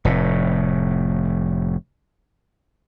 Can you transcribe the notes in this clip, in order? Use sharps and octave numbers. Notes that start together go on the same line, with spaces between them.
F1 A2